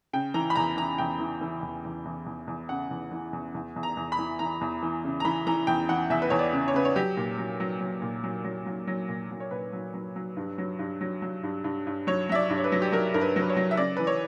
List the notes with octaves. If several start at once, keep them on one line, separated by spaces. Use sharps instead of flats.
C#3 G5
E3 A#5
B5
E2 A#5
E3 A#5
E2 G5
E3
E3
E2
E2
E2
E2
E2
C#3 F#5
E2
E3
E2
E2
E2
A#5
E2
B5
E3
E3 A#5
E2
E3
C#3
A#5
E3 B5
E3 A#5
E2 G5
E3 F#5
E2 E5
B4
E2 C#5
D5
C#3
C#5
C#3 B4
C#5
F#3 G4
A#2
F#3
F#3
F#3
A#2
F#3
F#3
F#3
F#3
A#2
F#3
C#5
A#2 B4
F#3
F#3
F#3
G2
F#3
G2
F#3
F#3
G2
G2
G2
F#3 C#5
F#3 E5
D5
G2
C#5
B4
F#3
G4
F#3 A#4
G2 A#4
B4
F#3
B4
C#5
F#3
E5
C#3 D5
E3 B4
C#5